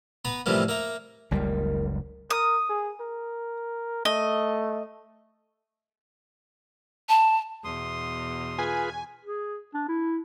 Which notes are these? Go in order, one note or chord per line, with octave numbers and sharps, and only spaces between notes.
B3 B4 A#5
A2 C3 E3 F3 G3 A#3
A#3 E5 A#5
F#1 C#2 A#2 D#3 G3 A#3
A#4 D#6
G#4
A#4
A3 D#5
A5
E2 B2 C6 D#6
F4 G#4 B4 G#5
G#4
D4
E4